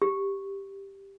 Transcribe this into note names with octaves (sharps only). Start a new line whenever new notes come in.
G4